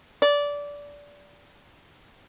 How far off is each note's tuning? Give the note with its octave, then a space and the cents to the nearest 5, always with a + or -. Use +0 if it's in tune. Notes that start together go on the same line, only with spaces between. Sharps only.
D5 -20